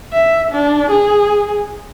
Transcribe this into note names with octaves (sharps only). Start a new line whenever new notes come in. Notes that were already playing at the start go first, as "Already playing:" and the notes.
E5
D4
G#4